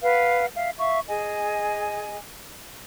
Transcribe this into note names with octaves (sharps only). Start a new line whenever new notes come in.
B4 F5 F#5
E5 F5
E5 F5 C#6
G#4 D#5 G#5